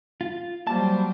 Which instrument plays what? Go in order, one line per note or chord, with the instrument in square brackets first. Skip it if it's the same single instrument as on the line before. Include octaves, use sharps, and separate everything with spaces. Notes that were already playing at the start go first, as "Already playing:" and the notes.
[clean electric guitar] F4
[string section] F#3 G3 C5 [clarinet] A#3 [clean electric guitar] A5